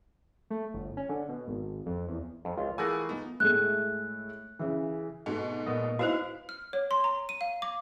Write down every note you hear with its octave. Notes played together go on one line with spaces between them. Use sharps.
A3
G1
C#4
D3
B2
G#1
F2
E2
F2
C#2 F4
E3 A3 G#4 A#4 F#5 G#5
B3 D#4
A2 G#3 A3 F#6
C#3 E3
G#2 B2 A3
A#2 B3 D#5
D#4 E4 F#4 B4 C5 F5
F6
C#5
C6
A#5
D#7
F5
D6